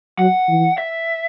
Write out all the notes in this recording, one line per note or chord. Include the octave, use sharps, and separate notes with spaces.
F#3 F#5
E3
E5